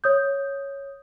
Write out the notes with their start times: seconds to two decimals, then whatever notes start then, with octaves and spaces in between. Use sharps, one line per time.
0.04 C#5 D#6 G6